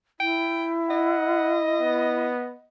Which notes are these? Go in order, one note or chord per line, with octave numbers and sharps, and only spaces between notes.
E4 G5
D#5 F#5
B3